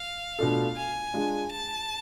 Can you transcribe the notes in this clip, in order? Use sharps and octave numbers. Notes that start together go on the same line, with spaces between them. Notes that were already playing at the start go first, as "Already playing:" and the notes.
Already playing: F5
B2 A3 D4 F4 A4
G#5
G#3 D4 F4
A5